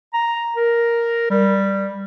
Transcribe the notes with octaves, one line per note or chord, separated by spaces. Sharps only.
A#5
A#4
G3